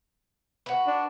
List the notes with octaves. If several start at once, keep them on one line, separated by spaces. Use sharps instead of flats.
F#4 B4
D4